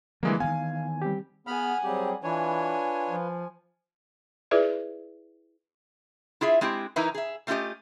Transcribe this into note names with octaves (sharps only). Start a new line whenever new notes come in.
D3 E3 F3 G3 G#3 A#3 D4
D#3 E3 B3 F5 G#5
G3 C4 G4
B3 G#4 F#5 G#5 B5 F6
F#3 G3 C4 G4 G#4
E3 D4 F4 B4 C#5 G#5
F3
E4 F4 G#4 B4 D5 E5
E4 F4 G#4 E5
G#3 C4 E4 G4
E3 D#4 E4 A#4 B4
G#4 E5
G3 A3 C#4 F4 G4 D#5